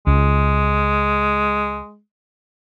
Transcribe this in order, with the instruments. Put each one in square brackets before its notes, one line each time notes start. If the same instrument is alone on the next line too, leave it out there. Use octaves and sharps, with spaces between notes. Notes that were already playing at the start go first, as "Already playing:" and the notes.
[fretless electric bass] C#2 [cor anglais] G#3